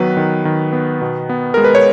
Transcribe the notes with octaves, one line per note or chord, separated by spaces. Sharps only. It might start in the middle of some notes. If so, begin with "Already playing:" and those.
Already playing: D#3 F#3 B3 B4
D#3
D#3
B3
B2
B3
G#3 A#4
B4
C#5